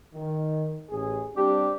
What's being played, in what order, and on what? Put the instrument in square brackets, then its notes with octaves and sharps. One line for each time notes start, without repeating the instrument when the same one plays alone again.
[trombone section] D#3
A1 G#4
[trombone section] G3 C4 D4 [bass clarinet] G4